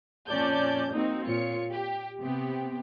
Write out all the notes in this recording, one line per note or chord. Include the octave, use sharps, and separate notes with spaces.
F2 A#2 C#4 D5 A5 G6
A#3 C4 D#4 F#4
A#2 F4 C#5 C#7
G4
C3 B3 G4